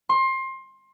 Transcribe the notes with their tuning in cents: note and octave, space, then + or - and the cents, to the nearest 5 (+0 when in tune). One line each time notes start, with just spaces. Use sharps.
C6 +25